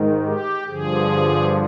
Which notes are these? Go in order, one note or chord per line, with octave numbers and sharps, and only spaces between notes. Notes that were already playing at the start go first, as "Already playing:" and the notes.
Already playing: G#2 D#3
G4
G2 D3 F3 G#4